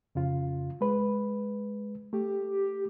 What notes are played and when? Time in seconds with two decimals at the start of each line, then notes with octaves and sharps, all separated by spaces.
0.15 F2 C#3 F4
0.81 G#3 B4
2.13 A3 G4